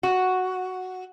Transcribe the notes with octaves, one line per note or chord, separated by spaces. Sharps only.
F#4